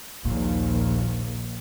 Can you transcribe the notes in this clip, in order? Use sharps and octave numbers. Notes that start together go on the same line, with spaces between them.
A#1 D#2 A#2